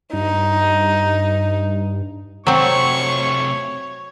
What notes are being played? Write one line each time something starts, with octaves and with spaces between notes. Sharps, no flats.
G2 D#4
C3 F#3 A3 C4 C#5 C#6